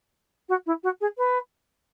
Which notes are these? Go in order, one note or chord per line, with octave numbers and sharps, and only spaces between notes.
F#4
E4
F#4
G#4
B4